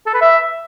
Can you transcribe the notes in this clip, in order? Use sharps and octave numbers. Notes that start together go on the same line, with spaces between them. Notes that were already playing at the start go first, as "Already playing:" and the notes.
A4
B4
E5